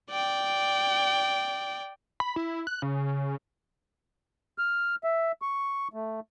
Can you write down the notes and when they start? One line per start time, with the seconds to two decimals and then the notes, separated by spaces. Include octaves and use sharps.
0.10 D5 G5
2.20 B5
2.36 E4
2.67 F#6
2.82 C#3
4.58 F6
5.04 E5
5.42 C#6
5.93 A3